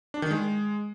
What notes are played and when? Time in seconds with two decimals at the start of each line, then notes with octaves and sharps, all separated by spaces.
0.14 D4
0.22 D#3
0.30 G#3